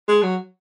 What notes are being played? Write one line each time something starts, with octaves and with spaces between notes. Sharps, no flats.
G#3
F#3